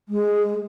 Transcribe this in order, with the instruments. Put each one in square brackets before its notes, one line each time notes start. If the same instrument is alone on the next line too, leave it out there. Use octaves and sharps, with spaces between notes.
[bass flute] G#3